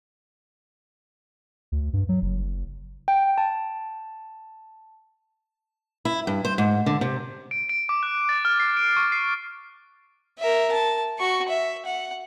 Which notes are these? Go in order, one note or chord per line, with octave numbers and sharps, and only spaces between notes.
D2
G2
F#3
F#1
G5
A5
E4
G2
C5
G#2
D3
C3
D7
D7
D6
F#6
A6
F6
C7
D7
C#6
C7
A#4 E5
A5
F#4 C#6
E5
F#5